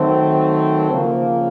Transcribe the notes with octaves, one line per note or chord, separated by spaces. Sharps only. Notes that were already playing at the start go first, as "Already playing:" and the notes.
Already playing: D#3 F#3 A3 C4
C#3 F3 A#3